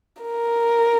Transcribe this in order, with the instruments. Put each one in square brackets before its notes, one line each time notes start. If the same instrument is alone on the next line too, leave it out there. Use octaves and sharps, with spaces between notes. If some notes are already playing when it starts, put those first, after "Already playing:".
[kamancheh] A#4